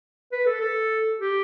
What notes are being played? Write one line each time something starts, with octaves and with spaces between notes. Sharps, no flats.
B4
A4
A4
G4